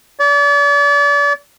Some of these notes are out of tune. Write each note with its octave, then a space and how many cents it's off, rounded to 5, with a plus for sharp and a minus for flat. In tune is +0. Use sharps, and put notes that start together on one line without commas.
D5 -40